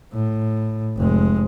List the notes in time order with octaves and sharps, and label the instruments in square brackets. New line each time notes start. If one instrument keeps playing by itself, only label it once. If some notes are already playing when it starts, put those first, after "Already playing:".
[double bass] A2
F1 G#3